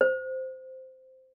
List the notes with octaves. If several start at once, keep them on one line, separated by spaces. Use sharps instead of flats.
C5